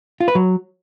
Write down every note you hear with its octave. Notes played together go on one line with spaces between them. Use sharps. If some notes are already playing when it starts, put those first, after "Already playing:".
F4
B4
F#3